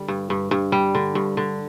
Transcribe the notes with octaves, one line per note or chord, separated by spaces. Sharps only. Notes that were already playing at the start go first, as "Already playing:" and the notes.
Already playing: D3 G3
G2
G2
G2
G3
D3
G2
D3